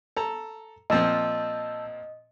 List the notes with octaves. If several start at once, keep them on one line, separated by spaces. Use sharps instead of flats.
A4 A#5
A#2 F3 C4 D#5 A5 E6 G6